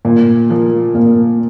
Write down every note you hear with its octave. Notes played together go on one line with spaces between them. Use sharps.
A#2
F3 A#3
A#2 A#3